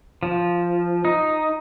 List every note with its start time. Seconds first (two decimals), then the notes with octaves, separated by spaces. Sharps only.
0.23 F3
1.05 D#4